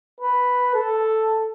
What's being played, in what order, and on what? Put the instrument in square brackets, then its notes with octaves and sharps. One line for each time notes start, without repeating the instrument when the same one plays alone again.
[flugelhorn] B4
A4